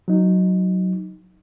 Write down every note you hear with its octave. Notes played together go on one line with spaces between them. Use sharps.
F#3 D#4